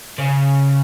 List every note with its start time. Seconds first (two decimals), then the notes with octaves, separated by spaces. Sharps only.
0.18 C#3